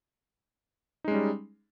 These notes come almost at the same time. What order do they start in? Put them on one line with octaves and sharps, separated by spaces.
D#4 G#3 C#4 G3